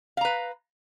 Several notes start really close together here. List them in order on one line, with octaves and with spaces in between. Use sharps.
F5 A#5 B4